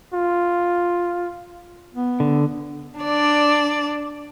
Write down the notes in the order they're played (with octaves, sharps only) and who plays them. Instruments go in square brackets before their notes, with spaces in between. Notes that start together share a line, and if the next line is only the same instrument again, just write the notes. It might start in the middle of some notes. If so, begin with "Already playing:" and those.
[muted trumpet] F4
[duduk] B3
[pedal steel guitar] D3
[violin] D4 D5